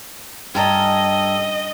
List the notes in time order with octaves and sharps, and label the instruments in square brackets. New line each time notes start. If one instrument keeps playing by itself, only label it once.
[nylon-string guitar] G2 [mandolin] C#4 A4 A#5 [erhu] D#5